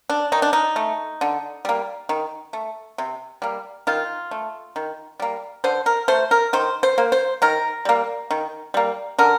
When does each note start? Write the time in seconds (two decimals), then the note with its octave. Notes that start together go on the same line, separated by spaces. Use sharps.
0.10 D4
0.32 D#3 D#4
0.42 D4
0.53 D#4
0.76 A3
1.21 D3
1.65 G3 A#3
2.09 D#3
2.53 A3
2.98 C3
3.42 G3 A#3
3.87 D#3 F4
4.31 A3
4.76 D#3
5.20 G3 A#3
5.64 D3 C5
5.86 A#4
6.08 A3 C5
6.31 A#4
6.53 D#3 C5
6.83 C5
6.98 A#3
7.12 C5
7.42 D#3 A#4
7.85 G3 A#3
8.31 D#3
8.74 G3 A#3
9.19 D3 A#4